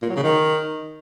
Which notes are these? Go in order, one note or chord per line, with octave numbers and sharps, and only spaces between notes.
A#2
F#3
C#3
D#3